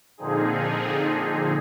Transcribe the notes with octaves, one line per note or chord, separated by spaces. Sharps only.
A#2 D3 F3 C4 D#4 G#4